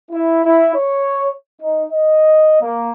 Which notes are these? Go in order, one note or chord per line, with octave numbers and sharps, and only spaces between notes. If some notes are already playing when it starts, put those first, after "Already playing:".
E4
E4
C#5
D#4
D#5
A#3